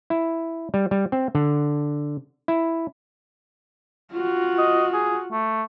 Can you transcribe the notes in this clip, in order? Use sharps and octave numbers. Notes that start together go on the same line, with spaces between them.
E4
G3
G3
C4
D3
E4
F4 F#4
D#5
G#4
A3